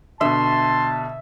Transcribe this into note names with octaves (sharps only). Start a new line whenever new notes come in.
B2 D3 E5 A5 C6